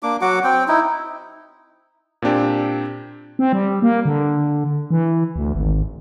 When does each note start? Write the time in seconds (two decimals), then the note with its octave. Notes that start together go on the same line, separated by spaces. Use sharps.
0.03 A#3 D4 D6
0.21 F#3 F#4 F#5 D6
0.44 C4 G5
0.68 D#4 E4
2.22 A#2 C4 D4 G4
3.39 C4
3.53 G3
3.82 A#3
4.05 D3
4.91 E3
5.36 D2
5.55 G#1